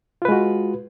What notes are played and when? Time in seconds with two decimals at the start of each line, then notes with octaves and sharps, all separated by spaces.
0.22 F4
0.25 B4
0.28 G#3
0.32 F#4